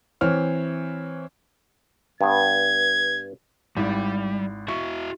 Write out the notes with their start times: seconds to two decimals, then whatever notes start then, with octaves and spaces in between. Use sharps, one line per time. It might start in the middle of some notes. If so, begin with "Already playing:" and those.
0.21 E3 C4 C#5 F6
2.21 G2 B3 G#6
3.77 G#1 G3 E4
4.68 E4 F#4 E5 C#6